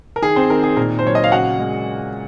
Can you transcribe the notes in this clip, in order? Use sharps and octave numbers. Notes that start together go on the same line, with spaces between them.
A#4
D#3 G#4
C4 C5
D#3 A#4
G#4
A#2 A#4
C5
F#3 C#5
D#5
F5
C#3 F#4 F#5
G#3